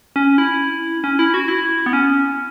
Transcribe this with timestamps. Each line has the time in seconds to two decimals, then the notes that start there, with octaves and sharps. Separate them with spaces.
0.16 C#4
0.38 E4
1.04 C#4
1.19 E4
1.34 F#4
1.48 E4
1.86 B3
1.93 C#4